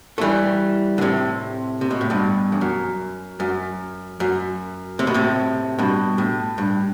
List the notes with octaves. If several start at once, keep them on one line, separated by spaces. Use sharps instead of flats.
A3
E3 G3
D3
A2 C3
C3
B2
A2
G2 B2
E2
F#2
F#2
F#2
C3
B2
A2 C3
G2 B2
A2
G2